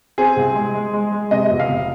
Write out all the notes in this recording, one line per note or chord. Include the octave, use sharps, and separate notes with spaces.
C4 G#4
C2
G#3
G#3
G#3
G#3
C3 D#5
F1
F5
F1